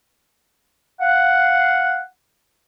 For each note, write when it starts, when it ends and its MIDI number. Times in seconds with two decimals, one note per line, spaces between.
1.01 2.01 77
1.01 2.01 78